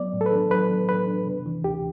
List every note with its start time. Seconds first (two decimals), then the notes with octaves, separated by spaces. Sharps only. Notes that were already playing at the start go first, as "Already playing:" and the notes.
Already playing: F#3 B3 D5
0.13 A2
0.21 A4
0.26 B4
0.32 D4
0.51 F#3 B4
0.69 B3
0.89 A2 B4
1.08 D4
1.26 C3
1.46 E3
1.64 D2 G4